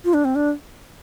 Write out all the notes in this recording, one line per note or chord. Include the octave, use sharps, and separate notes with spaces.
F4
D4
C4
D4